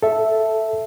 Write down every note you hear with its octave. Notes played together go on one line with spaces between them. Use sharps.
A4 E5